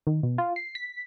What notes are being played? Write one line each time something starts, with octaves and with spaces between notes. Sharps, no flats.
D#3
B2
F4
C7
B6